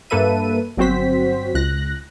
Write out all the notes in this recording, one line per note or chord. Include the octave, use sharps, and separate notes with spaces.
G2 A#3 A4 B4 E5 D#7
G1 F#3 C4 F#4 C5 B6
C#2 F#6 A#6